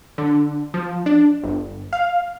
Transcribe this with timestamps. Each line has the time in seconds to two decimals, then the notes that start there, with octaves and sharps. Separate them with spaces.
0.18 D3
0.74 F3
1.06 D4
1.43 G1
1.93 F5